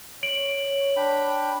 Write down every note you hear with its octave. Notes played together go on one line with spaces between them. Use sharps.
C#5 D7 F#7
D4 G5 B5